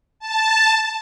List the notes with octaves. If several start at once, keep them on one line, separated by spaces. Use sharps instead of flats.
A5